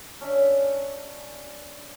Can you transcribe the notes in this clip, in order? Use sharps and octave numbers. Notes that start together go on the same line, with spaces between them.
C#4 D4 E5